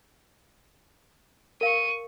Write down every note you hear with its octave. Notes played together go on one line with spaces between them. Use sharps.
A#4 F5 C#6 D#7